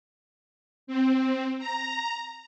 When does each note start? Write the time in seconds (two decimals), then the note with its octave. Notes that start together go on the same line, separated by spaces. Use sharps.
0.87 C4
1.59 A#5